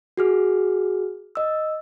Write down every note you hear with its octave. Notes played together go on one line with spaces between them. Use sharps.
F#4 G#4 F6
D#5 E6